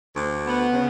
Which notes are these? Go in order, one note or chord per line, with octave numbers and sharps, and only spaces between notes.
D2
B3
C#3